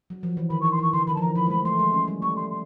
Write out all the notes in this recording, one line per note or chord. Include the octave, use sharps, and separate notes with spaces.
F#3
F3
E3
D#3 B5
C#6
E3
C6
E3 C#6
D3 C6
D#3 B5
F3 A5
E3 A#5
F3 B5
G#3
A3 B5
A3 C6
G#3
C#4
G3
A3 C#6
C6
C6